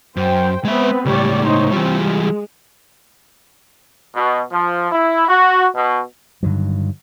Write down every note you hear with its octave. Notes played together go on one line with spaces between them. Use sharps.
F#2 C5 G5
G#3 B3 C4 B4 E5
C#2 A2 G3 C#5 D5
D#4 C5 C#5
E3 G3 C4 F4
G#3
B2
F3
E4
F#4
B2
G2 D3 D#3 F#3